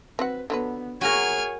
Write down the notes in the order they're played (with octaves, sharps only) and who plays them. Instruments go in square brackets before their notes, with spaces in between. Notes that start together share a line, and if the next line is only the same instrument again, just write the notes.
[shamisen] C4 F#4 F#5 [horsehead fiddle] B4
[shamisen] D3 F#3 B4 [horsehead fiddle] B3
[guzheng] F#4 A#4 [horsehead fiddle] G#4 C#5 [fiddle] G#5 F6